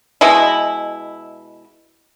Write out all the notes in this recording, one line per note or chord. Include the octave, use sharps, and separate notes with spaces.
B2 G#3 B3 E4